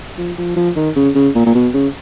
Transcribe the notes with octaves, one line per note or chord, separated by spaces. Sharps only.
F3
F3
F3
D#3
C#3
C#3
A#2
A#2
B2
C#3